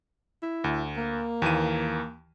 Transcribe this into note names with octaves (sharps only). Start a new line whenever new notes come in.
E4
D2
A#3
D#2 E3 D#7